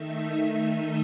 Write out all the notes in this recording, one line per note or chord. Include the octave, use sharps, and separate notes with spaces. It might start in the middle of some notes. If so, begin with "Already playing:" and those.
Already playing: D#3 A3 D#4 E5
D#5